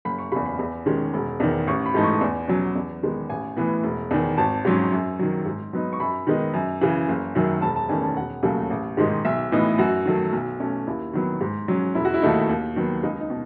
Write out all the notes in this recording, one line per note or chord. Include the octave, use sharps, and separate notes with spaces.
F#1 B5
C#6
E2 C#3 B5
B5
E2
D#3 G#3 C#4
E1
E2 D#3
A1 C#6
B5
G#2 E3 A3 D#4
C#6
E2
B2 F#3 C#4
E2
D#3 G#3 B3
A1 G#5
A2 E3 B3
E1
E2 D#3
G#1 A5
G#2 F#3 C#4
F#2
D#3 F#3
G#2
F#3 B3 D#4
C#6
F#2 B5
D#3 G#3 B3 D#4
F#2
C#3 E3
F#1
F#2 D#3 F#3
E1 A5
A5
E2 D#3 A3 C#4 G#5
A5
E1 F#5
D#2 C#3 F#3 A3
A1
G#2 D#3 G#3 D#4
B1 E5
A2 E3 B3 D#4
F#2 F#4
D#3 F#3 A3
B1
B2 A3 C#4
D#2 E4
D#3 F#3 B3
G#2
F#3 C#4
E1 E4
F#4
E4
D#2 D#3 A3 D#4
D#2
D#3 F#3 B3
C#2 D#4
D#4
B2